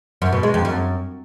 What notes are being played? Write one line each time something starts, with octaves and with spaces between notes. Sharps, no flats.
F#2
B2
G#3
F2
F#2